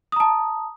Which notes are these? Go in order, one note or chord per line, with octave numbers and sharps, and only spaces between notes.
A5 A#5 D#6